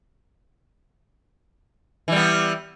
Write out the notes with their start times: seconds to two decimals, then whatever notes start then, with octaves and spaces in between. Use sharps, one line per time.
2.08 E3
2.12 G3
2.16 B3